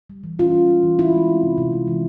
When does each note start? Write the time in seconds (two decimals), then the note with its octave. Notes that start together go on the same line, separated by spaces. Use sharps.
0.10 G3
0.24 E3
0.39 C#4 F4
0.53 G3
0.69 G3
0.83 E3
0.99 E3 E4
1.13 G#3
1.28 C4
1.43 C3
1.58 C3
1.73 G#3
1.87 E3